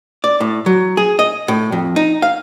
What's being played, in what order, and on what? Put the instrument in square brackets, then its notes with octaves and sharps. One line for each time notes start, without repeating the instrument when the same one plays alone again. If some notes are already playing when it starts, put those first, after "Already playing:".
[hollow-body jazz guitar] D5
A2
F#3
G#4
D#5
A2
F2
D#4
F5